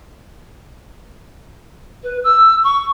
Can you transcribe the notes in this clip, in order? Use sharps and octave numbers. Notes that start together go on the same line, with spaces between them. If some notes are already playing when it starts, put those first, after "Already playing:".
B4
E6
C#6